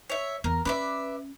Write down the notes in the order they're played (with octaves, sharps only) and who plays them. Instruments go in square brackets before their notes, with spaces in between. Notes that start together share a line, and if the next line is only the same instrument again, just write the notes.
[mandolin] C#5 E5
[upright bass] E2 [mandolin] A#4
[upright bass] C#4 [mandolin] B4 D5 E5